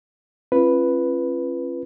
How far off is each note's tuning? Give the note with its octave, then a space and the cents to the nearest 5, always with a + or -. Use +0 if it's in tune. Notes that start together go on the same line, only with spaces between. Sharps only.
C#4 -45 F4 -35 B4 +0